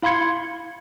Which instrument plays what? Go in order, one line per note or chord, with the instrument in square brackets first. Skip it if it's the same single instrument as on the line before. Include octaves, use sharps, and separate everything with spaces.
[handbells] E4 F5 B5 C6 G#6 C#7